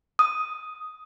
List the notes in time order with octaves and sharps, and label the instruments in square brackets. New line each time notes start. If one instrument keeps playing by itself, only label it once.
[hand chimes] D#6